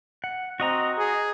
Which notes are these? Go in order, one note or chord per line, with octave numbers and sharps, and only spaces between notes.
F#5
C4 F#4 D#5 A#5
G#4